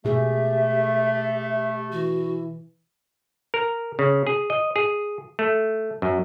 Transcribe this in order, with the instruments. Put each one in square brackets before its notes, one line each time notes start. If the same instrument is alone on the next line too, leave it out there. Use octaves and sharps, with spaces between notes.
[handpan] B2 G#4 [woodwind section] A3 [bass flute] G4 [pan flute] E5
[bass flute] E3 [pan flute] F#4
[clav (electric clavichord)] A#4
C#3
G#4
D#5
G#4
A3
F#2